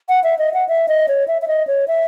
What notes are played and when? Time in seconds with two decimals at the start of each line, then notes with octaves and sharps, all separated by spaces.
0.09 F#5
0.24 E5
0.39 D#5
0.54 F#5
0.69 E5
0.88 D#5
1.08 C#5
1.28 E5
1.42 E5
1.48 D#5
1.67 C#5
1.88 E5